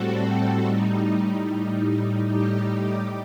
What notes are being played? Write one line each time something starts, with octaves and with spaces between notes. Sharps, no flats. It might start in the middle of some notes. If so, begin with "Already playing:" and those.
Already playing: A2 G3 C4 F#4 A4
A2 G3 D#4
A2 G3 D#4
A2 G3 D#4 G4